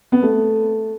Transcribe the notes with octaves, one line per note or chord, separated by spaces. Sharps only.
B3
A3